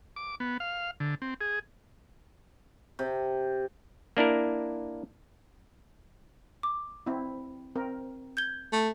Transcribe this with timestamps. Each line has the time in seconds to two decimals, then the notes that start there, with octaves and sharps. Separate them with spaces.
0.16 D6
0.40 B3
0.60 F5
1.00 D3
1.22 C4
1.41 G#4
2.99 C3
4.17 A#3 D4 E4 A#4
6.63 D6
7.06 C4 E4
7.76 C4 A#4
8.37 G6 G#6 G7
8.73 A3